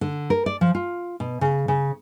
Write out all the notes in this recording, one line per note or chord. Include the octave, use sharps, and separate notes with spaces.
D3
A#4
D5
F3
F4
B2
C#3
C#3